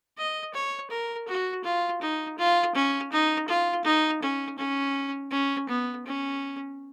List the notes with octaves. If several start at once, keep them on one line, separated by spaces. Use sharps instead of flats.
D#5
C#5
A#4
F#4
F4
D#4
F4
C#4
D#4
F4
D#4
C#4
C#4
C#4
B3
C#4